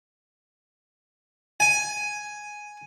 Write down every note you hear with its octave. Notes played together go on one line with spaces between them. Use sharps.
G#5